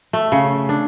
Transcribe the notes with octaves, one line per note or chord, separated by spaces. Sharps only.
A3
C#3
D4